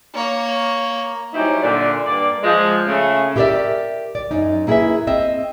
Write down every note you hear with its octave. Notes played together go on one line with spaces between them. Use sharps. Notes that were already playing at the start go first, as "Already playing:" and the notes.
A#3 C#5
F#3 G3 C4 C#4 D#4 E4
A#2 D3 D5
G2 A#3 D5
F3 G#3
C#3 A3
E4 G4 A#4 B4 D5 E5
D5
F#2 C#4 D#4
A#3 E4 G#4 A4 B4 E5
C4 D#5 E5